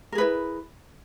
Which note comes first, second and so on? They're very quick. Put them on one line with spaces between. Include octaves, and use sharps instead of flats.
A#4 G#4 B4 E4